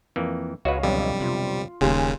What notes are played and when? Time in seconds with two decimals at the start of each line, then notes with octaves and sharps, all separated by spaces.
0.16 F2 E3 A#3
0.65 C#2 F#4 B4 C#5 D#5 F5
0.83 B1 F2 D3 G3
1.21 C3 F4
1.81 D#1 D#2 C#3 G3 G#5 C6